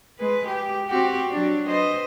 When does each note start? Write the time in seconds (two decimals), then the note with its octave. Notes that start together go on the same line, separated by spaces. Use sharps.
0.18 G#3 B4
0.48 G4
0.88 C4 F#4 G4
1.31 F#3 D4
1.68 B4 C5 D#5